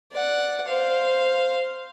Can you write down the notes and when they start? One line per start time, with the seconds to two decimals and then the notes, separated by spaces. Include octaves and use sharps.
0.12 D5 F#5
0.67 C5 F5